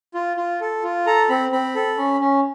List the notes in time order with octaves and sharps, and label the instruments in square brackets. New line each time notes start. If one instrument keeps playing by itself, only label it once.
[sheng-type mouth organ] F4
F4
A4
F4
A4 A#5
C4 B5
C4 B5
A4
C#4
C#4